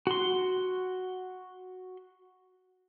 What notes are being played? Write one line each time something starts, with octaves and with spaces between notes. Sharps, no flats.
F#4 C6